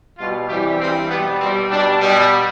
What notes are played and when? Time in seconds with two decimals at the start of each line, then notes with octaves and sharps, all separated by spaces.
0.18 B2 G3 F4
0.49 C3 E3 G3 G4
0.79 G2 E3 G3 C4
1.10 B2 G3 B3
1.40 B2 G3 C4
1.70 B2 G3 D4
2.01 B2 G3